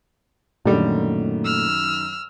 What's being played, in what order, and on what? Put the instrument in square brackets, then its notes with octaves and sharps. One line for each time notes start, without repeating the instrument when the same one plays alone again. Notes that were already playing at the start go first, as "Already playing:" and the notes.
[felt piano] F#2 D#3 [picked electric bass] A#2 A3 [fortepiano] D3 G3
[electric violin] E6 F6